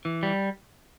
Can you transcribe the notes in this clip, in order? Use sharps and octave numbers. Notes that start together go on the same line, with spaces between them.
E3
G3